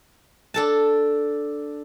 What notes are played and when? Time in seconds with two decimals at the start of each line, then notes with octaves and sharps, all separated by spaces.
0.54 D4 A4 A5